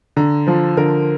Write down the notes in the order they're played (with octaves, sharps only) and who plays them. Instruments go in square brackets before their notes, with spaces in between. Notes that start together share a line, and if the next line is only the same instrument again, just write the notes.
[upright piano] D3 [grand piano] A#5
[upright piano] F3 [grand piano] C5
[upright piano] D3 [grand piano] A#4